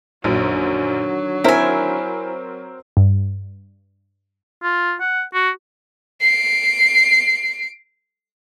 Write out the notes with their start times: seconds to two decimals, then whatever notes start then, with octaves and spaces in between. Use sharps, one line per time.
0.24 A#1 F#2 D3 D#3 F#3
1.44 C4 E4 A#4 C5 G#5
2.97 G2
4.63 F4
5.00 F#5
5.34 F#4
6.22 C7 D7